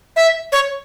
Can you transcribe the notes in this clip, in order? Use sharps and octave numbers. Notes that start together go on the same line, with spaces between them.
E5
C#5